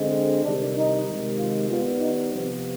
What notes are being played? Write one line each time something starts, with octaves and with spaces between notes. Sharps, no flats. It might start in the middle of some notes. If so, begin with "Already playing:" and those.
Already playing: D3 G#3 C4
C3 D#3 G3 D4
D#4
C3 D#3 G#3
F4
D#3 G3 B3 F4
D#4
C3 F3 B3 C4